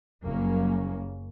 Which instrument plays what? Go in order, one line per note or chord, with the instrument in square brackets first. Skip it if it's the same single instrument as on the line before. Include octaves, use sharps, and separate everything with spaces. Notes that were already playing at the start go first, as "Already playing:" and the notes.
[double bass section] F#1 F#2 C#3 G3 A#3 C#4